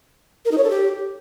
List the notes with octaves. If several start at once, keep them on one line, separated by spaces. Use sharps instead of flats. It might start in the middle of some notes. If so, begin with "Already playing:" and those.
A#4
D#4
C#5
A4
G4